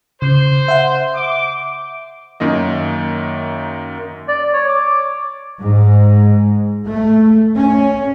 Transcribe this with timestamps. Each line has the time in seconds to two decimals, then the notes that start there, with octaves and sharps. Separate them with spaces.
0.22 C#3 C5
0.68 E5 F#5
1.16 D6
2.40 F#2 D#3 A#3 D#5
4.28 D5
4.53 C#5
4.68 D6
5.60 G#2
6.87 A3
7.55 C#4